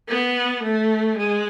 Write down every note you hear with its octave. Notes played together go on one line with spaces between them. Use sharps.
B3
A3
G#3